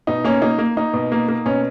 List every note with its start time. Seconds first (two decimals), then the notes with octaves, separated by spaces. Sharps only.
0.07 B2 D#4
0.24 A#3 C#4
0.42 A#3 D#4
0.59 A#3
0.77 A#3 D#4
0.94 B2
1.12 A#3
1.29 A#3
1.46 B2 C#4